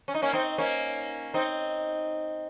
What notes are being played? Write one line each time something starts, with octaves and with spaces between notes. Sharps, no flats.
C#4
D#4
A#3 C#4
C4 D#4
A#3 C#4
C4 D#4